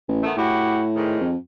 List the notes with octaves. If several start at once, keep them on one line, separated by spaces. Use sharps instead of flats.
A1
D#3 A3 B3
A2 E4 F#4 G4
G#2 D#3
F2